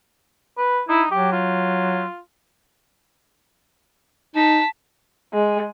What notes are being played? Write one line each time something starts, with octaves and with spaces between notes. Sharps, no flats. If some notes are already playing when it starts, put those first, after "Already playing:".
B4
D#4 E4
F#3 G4
F4
D#4 A5 B6
G#3